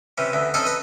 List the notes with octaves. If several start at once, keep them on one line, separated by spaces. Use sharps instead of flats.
C3 E3 C#4
D2 E3
C4 C#4 D#4 A4 D#5
B4 D#5